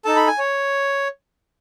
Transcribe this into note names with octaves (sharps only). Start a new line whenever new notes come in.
D#4 A4 A5
B5
G#5
C#5